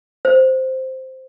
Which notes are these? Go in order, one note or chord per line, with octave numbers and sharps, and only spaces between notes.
C5